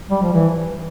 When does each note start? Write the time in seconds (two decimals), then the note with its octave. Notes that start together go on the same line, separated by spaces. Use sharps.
0.10 G3
0.22 F3
0.33 E3